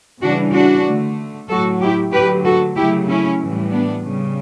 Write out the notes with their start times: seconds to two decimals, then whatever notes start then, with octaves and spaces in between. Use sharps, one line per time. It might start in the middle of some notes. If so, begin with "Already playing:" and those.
0.22 C#3 E3 G3 D4 F#4
0.54 D4 F#4
0.86 D3 A3
1.49 A2 F#3 A3 F#4 A4
1.81 E4 G4
2.12 D3 F#3 A3 G4 B4
2.45 F#4 A4
2.76 C#3 F#3 A3 E4 G4
3.08 C#4 E4
3.40 A2 E3 G3
3.71 B3 D4
4.03 C#3 G3